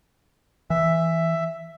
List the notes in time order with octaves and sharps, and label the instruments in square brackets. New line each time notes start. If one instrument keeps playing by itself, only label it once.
[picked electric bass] E3 [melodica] E5